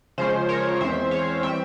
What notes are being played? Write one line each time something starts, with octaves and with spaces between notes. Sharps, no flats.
C#3 F3 G#3 C#4 C5
A#4 C#5
E2 E3 G#3 C4 C5 E5
C#5 F5
E3 G3 C4 E5 G5